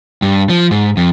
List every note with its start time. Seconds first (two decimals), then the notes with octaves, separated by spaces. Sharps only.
0.22 G2
0.50 F3
0.71 G#2
0.97 F2